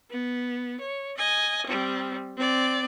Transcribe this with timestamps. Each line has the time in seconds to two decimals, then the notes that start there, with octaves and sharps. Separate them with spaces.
0.10 B3
0.80 C#5
1.17 D#5 G#5
1.66 G3 C4
2.37 C4 D5